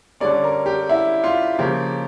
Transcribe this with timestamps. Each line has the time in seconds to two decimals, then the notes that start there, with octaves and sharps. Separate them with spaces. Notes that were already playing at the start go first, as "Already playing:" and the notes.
0.20 D3 G3 C#4 D5
0.44 A#4
0.66 G4
0.89 E4
1.24 F4
1.59 C#3 F3 A#3 G4